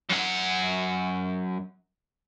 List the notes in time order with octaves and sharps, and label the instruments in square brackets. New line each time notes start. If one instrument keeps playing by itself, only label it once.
[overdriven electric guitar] F#2 F#5